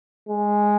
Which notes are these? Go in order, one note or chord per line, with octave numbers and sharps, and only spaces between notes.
G#3